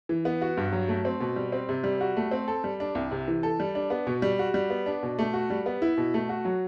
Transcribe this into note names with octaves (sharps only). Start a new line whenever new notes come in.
E3
B3
F#4
G2
F#3
A3
C4
B2
G3
C4
C3
G3
F#4
A3
C4
A4
G3
D4
C2
C3
E3
A4
G3
D4
B3
B2
G3
F#4
G3
B3
D4
B2
A3
F#4
G3
B3
E4
B2
A3
F#4
F#3